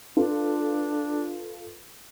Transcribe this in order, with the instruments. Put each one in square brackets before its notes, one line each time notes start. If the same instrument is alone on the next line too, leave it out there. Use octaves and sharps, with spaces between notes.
[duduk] D4 [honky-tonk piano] F4 A4 B4